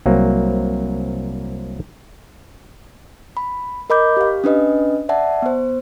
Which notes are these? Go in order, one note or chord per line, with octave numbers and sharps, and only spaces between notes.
C2 F#3 A#3 C4
B5
A#4 D#5 B5 D6 G6
G4 F5
C#4 D4 B4 D#5
D5 E5 F#5 A5
B3 C5